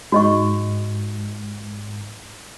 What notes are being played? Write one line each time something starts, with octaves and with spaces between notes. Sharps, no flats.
G#2 F#4 D#5 C#6